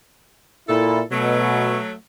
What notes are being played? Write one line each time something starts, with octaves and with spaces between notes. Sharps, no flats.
A#2 E4 A4
B2 F#3 A3